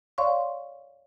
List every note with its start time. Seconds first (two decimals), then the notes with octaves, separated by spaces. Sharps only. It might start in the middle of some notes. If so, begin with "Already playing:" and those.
0.18 C#5 D5 F5 C6 C#6